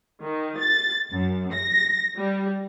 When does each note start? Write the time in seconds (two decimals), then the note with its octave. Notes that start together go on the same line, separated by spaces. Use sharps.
0.23 D#3
0.60 A6
1.13 F#2
1.53 A#6
2.17 G3